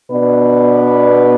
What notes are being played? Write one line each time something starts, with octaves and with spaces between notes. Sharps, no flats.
B2 B3 D4 B4 D5